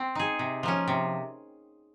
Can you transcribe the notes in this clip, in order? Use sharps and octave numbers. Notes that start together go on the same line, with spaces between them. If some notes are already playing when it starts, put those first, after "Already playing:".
Already playing: C4
D#4 G#4
C3
F3 A#3 C#4
C3